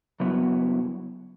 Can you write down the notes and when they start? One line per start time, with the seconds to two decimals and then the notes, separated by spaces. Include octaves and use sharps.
0.20 F#2 C#3 F#3 B3 E4